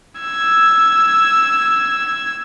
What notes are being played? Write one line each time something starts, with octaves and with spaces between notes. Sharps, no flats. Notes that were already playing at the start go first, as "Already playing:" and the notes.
E6 G#6